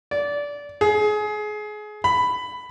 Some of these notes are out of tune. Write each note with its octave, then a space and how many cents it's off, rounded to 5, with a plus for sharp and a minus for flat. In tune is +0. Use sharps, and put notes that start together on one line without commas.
D5 -20
G#4 +25
B5 +10